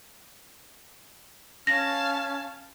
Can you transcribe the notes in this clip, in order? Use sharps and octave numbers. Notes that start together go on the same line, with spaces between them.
C#4 F5 A5 A#6